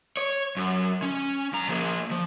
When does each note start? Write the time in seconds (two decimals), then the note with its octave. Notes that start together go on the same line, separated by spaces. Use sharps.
0.17 C#5
0.57 F#2
1.03 C#4
1.53 F#2 A#5
1.69 F3 A#3
2.11 F3